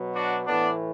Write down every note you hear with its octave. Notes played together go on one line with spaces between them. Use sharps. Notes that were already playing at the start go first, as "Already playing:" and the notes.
Already playing: B2 F#3
D4 F#4
A2 E3 B3 D4